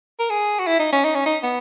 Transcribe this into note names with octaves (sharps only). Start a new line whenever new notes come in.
A#4
G#4
F#4
E4
D#4
C#4
D#4
C#4
D#4
B3